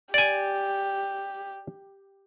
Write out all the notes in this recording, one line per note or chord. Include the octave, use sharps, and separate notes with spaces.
G4 D5 G#5